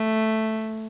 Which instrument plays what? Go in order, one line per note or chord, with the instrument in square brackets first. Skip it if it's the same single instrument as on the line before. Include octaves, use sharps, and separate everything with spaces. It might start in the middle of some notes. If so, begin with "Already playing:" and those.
Already playing: [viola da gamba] A3